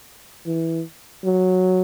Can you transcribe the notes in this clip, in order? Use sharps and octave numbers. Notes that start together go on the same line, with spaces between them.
E3
F#3